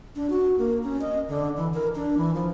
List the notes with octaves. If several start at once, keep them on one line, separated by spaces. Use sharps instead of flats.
D4
F#4
A#3
C#4
D#5
D3
E3
A#4
D4
E3
F3